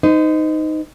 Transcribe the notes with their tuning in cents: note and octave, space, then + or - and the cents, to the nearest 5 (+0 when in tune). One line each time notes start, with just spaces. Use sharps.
D#4 +0 C5 -40